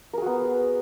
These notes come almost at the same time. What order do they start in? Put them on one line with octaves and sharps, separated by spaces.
A#4 G#4 F#4 B3